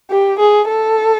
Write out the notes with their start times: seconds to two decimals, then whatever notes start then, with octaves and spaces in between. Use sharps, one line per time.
0.11 G4
0.39 G#4
0.68 A4